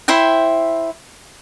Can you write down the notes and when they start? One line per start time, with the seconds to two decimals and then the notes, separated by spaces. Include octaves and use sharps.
0.08 E4 C5 E5 G5